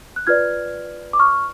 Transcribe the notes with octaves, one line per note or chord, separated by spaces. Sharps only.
F#6
F4 B4 D5 F6 G#6
D6
C#6 F6